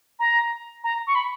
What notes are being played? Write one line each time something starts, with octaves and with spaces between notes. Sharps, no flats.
A#5
A#5
C#6
B5